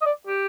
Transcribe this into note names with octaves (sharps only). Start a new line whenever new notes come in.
D#5
D5
G4